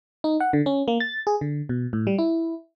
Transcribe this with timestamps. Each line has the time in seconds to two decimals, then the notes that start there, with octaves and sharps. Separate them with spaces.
0.24 D#4
0.40 F#5
0.53 D3
0.66 C#4
0.88 A#3
1.00 A6
1.27 G#4
1.41 D3
1.69 B2
1.93 A2
2.07 G3
2.19 E4